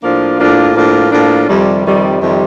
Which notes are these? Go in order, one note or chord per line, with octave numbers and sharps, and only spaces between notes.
A2 F3 A#3 D4 F4
A2 F3 A#3 D4 F4
A2 F3 A#3 D4 F4
A2 F3 A#3 D4 F4
F2 C3 D#3 G3
F2 C3 D#3 G3
F2 C3 D#3 G3